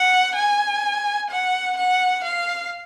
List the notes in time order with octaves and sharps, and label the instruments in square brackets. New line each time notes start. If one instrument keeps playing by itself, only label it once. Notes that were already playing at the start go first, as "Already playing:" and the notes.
Already playing: [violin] F#5
G#5
F#5
F#5
F5